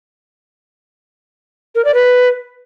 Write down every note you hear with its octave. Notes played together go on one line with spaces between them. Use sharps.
A#4
D5
B4